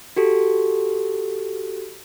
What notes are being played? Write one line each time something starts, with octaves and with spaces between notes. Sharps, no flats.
F#4 G4 A4